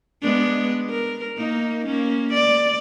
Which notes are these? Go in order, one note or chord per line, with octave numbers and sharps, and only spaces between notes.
G#3 B3 D4
A#4
A#3 D#4
A#3 C#4
D5